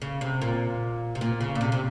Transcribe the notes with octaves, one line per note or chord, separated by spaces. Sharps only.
C#3
C3
A#2
C3
A#2
C#3
A#2
C3
C3